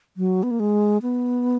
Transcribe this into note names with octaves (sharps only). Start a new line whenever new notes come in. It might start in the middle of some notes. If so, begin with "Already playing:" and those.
F#3
B3
A#3
G#3
B3